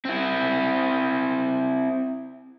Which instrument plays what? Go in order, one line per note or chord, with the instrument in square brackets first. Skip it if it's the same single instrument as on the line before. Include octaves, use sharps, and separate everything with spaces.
[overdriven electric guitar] C4 E4